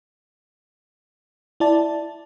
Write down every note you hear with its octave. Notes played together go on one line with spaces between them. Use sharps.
E4 D5 A5